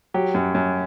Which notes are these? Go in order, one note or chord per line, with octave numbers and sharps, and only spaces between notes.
F#3 G4
F#2
F#2